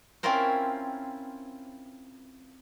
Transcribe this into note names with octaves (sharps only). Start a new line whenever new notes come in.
C4 C#4 E4 F4 A#4 C5